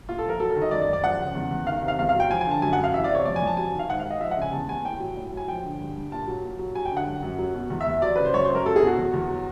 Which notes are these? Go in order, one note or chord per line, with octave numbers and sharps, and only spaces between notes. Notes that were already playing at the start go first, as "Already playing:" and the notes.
A#2 F4
A4
F3 A#4
F#3 A4
A4
D#3
D#5
F#2 D5
D5
F#2
D5
F3 F#5
C#3
E2
E2
D#3 F5
C3
F5
E2 F5
F5
F#3 G5
F3 G#5
G#5
D3 A5
F#2 G#5
F#5
F#2
F5
E3 E5
D5
C3
C#5
F2 D5
G#5
F2
A5
F#3 G#5
D#3
F5
G#2 F#5
F5
G#2
D#5
F3 E5
F#5
C#3 G#5
E2 A5
E2 G#5
A2 G5
F#3
A2
F#3 G#5
F3 G5
D3
G2
G2
A#2 A5
F#3
A#2
F#3
F#3 G#5
G5
D3
F#5
F#2
F#2
F#3
B2
E2
E5
E2
F#3 D5
C#3 B4
C5
F#2 C#5
C5
F#2 A#4
F#3 A4
G#4
B2
F#4
E2
E2
F#3